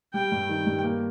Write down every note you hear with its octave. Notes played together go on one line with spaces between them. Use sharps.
G3 G5
G2
D#3
G2
A#3